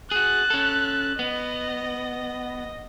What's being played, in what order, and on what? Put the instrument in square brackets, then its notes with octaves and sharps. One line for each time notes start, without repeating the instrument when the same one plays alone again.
[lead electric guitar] F#4 G#4 [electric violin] F#6 A6
[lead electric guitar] C#4 A4
[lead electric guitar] B3 [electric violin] D#5